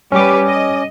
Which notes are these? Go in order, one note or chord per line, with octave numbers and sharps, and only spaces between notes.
G3 C#4 G4 B4 D6
D#5